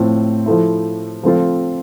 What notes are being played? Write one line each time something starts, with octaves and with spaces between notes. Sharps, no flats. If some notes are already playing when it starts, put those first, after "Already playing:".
Already playing: A2 F3 C4 F4
F3 A3 E4
F3 A3 C4 F4